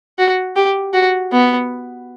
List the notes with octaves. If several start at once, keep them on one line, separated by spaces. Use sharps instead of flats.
F#4
G4
F#4
B3